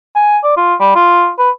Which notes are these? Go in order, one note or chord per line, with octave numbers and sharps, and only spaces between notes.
G#5
D5
F4
G3
F4
B4